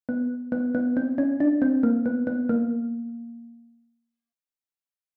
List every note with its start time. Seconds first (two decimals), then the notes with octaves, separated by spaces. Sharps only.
0.09 B3
0.52 B3
0.75 B3
0.97 C4
1.18 C#4
1.40 D4
1.62 C4
1.83 A#3
2.06 B3
2.27 B3
2.49 A#3